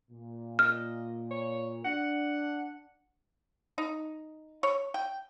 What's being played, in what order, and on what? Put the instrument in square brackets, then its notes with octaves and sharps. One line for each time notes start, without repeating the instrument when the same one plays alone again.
[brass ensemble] A#2
[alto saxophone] D#5 [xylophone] F6
[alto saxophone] C#5
[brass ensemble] D4 [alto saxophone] F#5
[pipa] D#4
C#5
G5